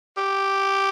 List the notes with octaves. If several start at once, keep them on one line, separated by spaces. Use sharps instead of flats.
G4